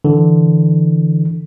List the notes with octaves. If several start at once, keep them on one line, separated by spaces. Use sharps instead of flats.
D3 E3